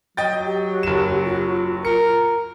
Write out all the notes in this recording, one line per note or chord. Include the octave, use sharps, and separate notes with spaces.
F#3 D#5 G5 A6
G4
F#1 E7
F4
A#4 C#7